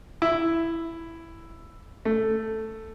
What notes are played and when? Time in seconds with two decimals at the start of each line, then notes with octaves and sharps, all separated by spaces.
0.22 E4
2.05 A3